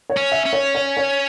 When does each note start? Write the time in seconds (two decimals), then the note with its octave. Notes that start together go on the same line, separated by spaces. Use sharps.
0.10 C#5
0.17 C#4
0.32 E5
0.46 C#4
0.53 C#5
0.75 C#5
0.97 C#5